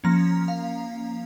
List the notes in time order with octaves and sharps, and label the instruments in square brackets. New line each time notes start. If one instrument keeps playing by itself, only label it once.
[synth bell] F3 A#3 C#4 A#5
F5